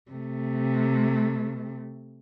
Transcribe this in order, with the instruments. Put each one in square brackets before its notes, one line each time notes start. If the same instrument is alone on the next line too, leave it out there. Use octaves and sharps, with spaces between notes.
[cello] C3 A3